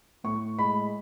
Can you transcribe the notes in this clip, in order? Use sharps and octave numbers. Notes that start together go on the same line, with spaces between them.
A2 C#6
G#3 B5